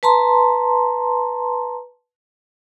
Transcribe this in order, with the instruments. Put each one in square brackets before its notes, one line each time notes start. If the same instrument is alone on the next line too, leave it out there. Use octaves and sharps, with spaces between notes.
[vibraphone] B4 A5 A#5 C6